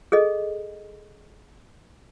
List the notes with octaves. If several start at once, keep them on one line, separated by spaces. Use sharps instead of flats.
G#4 A4 D#5